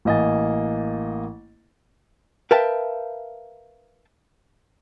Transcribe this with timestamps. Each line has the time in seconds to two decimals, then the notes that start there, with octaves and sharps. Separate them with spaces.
0.05 A1 A#3 D#5 G#5 A6
2.51 A#4 B4 E5 F5 G5 A5